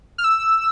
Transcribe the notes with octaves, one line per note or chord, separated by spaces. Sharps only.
F6
E6